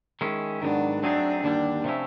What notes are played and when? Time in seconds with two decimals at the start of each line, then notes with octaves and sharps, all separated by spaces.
0.21 D#3 G#3 C#4 E4
0.62 G#2 D#3 F#3 B3 D4
1.03 F#3 A3 C4 D4 D#4 G#4
1.43 D#2 D3 G3 D4
1.84 C3 F3 A3 C#4 E4